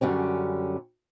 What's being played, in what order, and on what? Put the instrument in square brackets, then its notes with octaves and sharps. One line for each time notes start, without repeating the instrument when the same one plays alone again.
[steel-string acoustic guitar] F#2 D3 G3 C#4